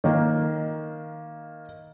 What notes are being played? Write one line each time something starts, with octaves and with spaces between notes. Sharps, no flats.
D#3 A#3